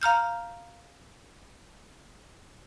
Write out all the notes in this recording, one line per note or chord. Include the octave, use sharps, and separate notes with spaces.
F5 A#5 F6 G6